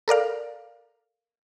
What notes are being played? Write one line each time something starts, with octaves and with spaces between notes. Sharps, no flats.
A4 A#4 D5 F5